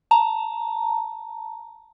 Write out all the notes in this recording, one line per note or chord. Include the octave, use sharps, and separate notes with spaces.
A5 A#5